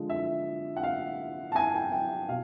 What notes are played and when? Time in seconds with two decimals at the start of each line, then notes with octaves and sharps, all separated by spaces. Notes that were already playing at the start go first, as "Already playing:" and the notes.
Already playing: D3 F3 G#3
0.09 E5
0.76 F#5
0.83 F5
1.52 A5
1.56 G#5
1.74 G5
1.92 G5
2.28 B2 F5